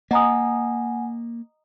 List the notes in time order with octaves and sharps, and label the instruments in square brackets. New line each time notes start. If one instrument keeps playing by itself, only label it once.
[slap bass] A#3 [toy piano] D#5 A#5 D#6 [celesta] F#5 G#5